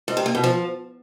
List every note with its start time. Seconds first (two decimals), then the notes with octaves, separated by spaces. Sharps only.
0.08 G#2
0.17 C3
0.26 A#3
0.35 B2
0.44 F3